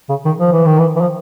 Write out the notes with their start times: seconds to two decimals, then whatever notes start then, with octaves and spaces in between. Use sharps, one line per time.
0.09 C#3
0.25 D#3
0.40 F3
0.52 E3
0.65 D#3
0.78 E3
0.96 E3
1.01 F3